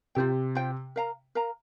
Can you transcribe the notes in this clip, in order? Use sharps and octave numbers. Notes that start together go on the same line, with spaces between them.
C3 F4 C5 G5
F4 C5 G5
A#4 F5 A#5
A#4 F5 A#5